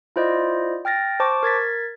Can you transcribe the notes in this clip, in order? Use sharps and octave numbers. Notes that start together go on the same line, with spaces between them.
E4 F4 C5 D5 D#5
G5 F6 A6 A#6
C5 A5 C#6 D6
A#4 G#6 A6 B6